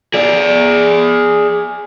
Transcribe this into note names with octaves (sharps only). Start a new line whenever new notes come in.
G#4 D5